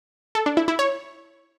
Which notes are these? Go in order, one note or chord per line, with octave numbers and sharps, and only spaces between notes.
A4
D4
E4
E4
C#5